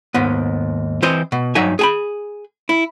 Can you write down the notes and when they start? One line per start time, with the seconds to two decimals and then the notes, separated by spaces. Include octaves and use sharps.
0.14 D#2 G#2 B3
1.02 E3 C4 C5 D#5
1.32 B2
1.55 G2 F#3 D#4 E5 G#5
1.79 G#4 G#5 B5
2.69 E4